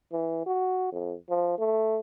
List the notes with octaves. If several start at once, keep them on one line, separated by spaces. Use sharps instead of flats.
E3
F#4
F2
F3
A3